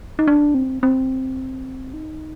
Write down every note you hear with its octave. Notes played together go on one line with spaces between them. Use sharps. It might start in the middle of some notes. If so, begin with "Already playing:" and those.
D#4
D4
C4
C4
D#4